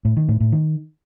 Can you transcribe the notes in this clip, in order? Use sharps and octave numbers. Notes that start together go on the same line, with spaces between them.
A2
D#3
A2
A2
D#3